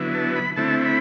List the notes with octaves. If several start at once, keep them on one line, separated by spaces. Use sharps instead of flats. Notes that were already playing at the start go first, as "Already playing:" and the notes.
Already playing: D3 F#3 B3 E4
A5
B5
D3 A3 C4 E4 A5
B5